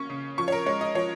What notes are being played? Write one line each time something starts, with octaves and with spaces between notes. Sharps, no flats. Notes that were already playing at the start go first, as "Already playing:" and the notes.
Already playing: A#3 C#4 C#6
C#3
F3 C#6
C#5
A#4
G#3 C#5
D#5
F3 C#5